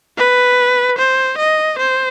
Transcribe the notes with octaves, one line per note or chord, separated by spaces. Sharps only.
B4
C5
D#5
C5